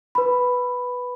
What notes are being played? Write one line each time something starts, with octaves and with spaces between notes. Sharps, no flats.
B4 B5